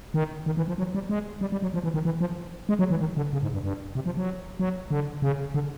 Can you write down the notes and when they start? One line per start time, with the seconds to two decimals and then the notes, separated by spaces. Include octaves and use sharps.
0.14 D#3
0.46 D#3
0.57 E3
0.68 F3
0.78 F#3
0.94 G3
1.09 G#3
1.41 G3
1.52 G3
1.62 F#3
1.74 F3
1.83 E3
1.94 D#3
2.05 E3
2.21 F3
2.69 G#3
2.79 F#3
2.90 E3
3.00 D#3
3.17 D3
3.33 C#3
3.43 G#2
3.53 G2
3.64 G2
3.95 C3
4.06 F3
4.17 F#3
4.59 F#3
4.91 D3
5.22 C#3
5.54 D3